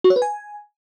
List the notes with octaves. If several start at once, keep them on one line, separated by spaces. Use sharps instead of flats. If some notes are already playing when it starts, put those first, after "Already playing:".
F#4
C#5
B4
G#5